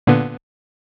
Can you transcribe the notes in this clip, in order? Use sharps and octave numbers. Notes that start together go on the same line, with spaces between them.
A#2 D3 B3